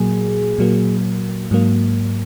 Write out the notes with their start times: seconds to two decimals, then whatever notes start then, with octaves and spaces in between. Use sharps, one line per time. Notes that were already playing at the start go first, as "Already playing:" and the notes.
Already playing: A#2 F#3 A#3 G#4
0.58 A#2 F#3 A#3
1.51 G#2 F#3 A#3